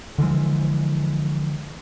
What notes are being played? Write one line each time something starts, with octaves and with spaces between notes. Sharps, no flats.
D3 E3 F3 G#3